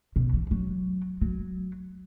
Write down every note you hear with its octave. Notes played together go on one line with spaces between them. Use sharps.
B2
E3
F#3
F#3